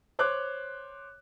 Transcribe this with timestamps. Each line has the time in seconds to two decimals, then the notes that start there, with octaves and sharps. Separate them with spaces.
0.19 C5 C#5 D6 F#6